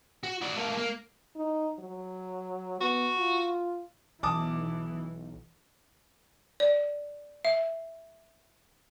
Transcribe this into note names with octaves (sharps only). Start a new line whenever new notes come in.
F#4
F#4 D5
A3 A#3
A#3
D#4
F#3
B3 F#4
F4
B1 E3 A5 D6 D#6
D5
E5